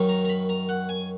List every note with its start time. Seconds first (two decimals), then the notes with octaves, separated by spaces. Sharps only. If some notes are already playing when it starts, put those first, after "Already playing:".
Already playing: F#2 D#3 F#3
0.09 A#5
0.25 A#5
0.29 B5
0.49 A#5
0.69 F#5
0.89 G#5